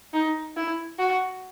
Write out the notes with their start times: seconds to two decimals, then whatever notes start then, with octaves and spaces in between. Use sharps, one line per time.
0.13 D#4
0.57 E4
0.99 F#4